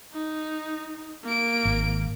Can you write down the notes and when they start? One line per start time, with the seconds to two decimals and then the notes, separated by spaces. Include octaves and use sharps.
0.13 D#4
1.24 A#3 D7
1.65 G#1